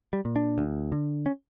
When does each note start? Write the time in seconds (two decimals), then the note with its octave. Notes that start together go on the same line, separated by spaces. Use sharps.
0.13 G3
0.25 A#2
0.36 D4
0.58 D2
0.92 D3
1.26 C#4